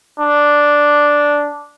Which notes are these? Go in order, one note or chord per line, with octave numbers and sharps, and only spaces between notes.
D4